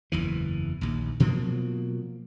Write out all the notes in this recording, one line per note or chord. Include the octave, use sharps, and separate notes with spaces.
F#1 E2 E3
A#1 D#2
B2 F3 F#3 A#3